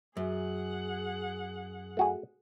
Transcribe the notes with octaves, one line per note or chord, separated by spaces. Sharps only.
F#2 G#4 F#5
A3 F#4 G#4